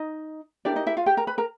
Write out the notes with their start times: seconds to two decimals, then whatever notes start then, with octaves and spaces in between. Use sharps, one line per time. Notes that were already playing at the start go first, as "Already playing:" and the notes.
Already playing: D#4 D#5
0.65 D4 E4 G4 A#4 D5
0.76 D#4 D#5
0.87 E4 E5
0.97 F4 F5
1.06 G4 G5
1.17 A#4 A#5
1.27 B4 B5
1.38 A#4 A#5